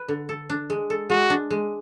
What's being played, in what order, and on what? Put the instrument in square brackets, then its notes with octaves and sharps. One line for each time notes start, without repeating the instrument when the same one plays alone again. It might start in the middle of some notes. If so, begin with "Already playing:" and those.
Already playing: [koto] B4
D3
A4
D4
G#3
A4
[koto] G#3 [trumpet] F#4
[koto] D4
G#3